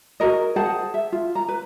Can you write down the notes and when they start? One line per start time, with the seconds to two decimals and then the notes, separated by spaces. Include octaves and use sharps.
0.20 F#4 G#4 A#4 D#5
0.56 G#4 C5 F#5 A5
0.94 E5
1.12 F4
1.35 A#5
1.48 B4